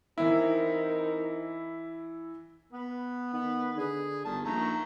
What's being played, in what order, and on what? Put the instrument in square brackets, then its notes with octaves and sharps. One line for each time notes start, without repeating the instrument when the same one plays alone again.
[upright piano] E3 E4 [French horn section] C4 D#4 A#4
[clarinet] B3 [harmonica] B4
[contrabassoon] D#3 [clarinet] B3
[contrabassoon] D3 [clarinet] G#4
[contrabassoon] G1 [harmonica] D#3 [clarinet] A5
[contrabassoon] A#1 [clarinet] D#4 [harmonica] E5 A#5 C#6